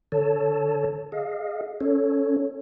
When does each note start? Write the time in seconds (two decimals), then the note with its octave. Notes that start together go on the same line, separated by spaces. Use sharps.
0.12 D3 A4 C#5 A5
1.12 G#4 D#5 F5
1.81 C#4 A4 C#5